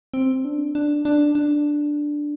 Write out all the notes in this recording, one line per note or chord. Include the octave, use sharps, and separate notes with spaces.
C4
D4
D4
D4
D4